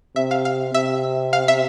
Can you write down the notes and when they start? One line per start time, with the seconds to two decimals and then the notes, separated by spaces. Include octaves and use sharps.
0.16 C3 E5
0.31 F5
0.45 F5
0.74 C3 E5
1.33 F5
1.48 E5